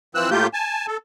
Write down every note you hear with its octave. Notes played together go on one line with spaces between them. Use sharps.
E3 F3 C4 E6 F#6
A2 A3 A#3 F4 G4 G6
G#5 A5
A4